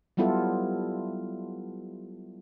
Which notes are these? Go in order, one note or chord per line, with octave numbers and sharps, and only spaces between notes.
F#3 G3 B3 E4 F4 A4